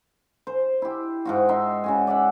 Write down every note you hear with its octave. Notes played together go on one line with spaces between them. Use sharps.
C5
E4 G4
G#2 F4 F#4
D#4 E5 C6
C#3 F#4 G#5
D5 E5 F#5